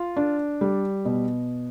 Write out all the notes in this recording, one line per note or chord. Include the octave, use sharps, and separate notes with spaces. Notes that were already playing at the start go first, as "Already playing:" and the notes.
Already playing: F4
D4
G3
B2